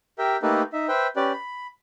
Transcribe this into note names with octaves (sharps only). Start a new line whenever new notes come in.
G4 A#4 E5 G5
A3 A#3 D#4 G4 A4 B4
D#4 E5
B4 C5 E5 G5
C#4 G4 B4 D5
B5